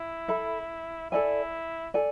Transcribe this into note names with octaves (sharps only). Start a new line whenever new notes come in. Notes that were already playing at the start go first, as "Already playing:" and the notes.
Already playing: E4
A4 E5 B5
E4 A4 D5 G#5
A4 D5 G#5